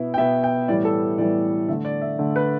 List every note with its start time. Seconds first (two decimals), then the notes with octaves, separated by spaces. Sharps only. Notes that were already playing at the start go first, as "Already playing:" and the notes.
Already playing: B2 B3 E4
0.14 G5
0.17 B2 B3 E5
0.44 G5
0.68 A2 E3 G3 B3 D5
0.85 A4
1.18 A2 E3 G3 B3 D5
1.68 D3 E5
1.71 A3
1.85 D5
2.01 E5
2.19 D3 A3
2.36 B4